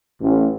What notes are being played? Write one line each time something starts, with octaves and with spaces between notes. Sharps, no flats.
A1